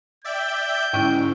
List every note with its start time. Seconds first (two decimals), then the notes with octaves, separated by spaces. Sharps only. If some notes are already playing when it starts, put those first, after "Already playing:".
0.24 D5 E5 G5 G6
0.93 G#2 D3 C#4 E4 G5